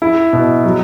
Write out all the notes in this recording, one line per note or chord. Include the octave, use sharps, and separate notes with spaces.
E4
B2
F#3